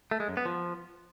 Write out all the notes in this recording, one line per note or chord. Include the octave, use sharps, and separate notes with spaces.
A3
G#3
F#2
B3
F3